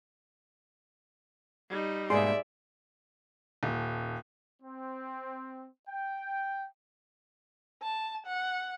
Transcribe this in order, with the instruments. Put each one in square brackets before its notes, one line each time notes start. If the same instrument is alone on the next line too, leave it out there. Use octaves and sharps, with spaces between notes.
[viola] G3 D#4
[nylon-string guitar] G#2 B2 A#3 [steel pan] G#4 C6 [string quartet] D5 E5
[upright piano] D#1
[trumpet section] C4
G5
[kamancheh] A5
F#5